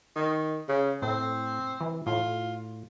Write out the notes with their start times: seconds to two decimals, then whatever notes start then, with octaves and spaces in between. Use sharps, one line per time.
0.15 D#3
0.68 C#3
1.02 A2 C4
1.81 E3
2.07 A2 F4